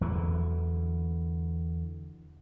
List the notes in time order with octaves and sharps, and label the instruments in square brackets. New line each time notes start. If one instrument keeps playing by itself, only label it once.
[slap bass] E2 D3 E3 F#3